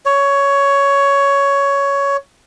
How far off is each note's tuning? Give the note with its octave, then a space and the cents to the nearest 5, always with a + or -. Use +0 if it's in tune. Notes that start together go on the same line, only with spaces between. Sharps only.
C#5 +10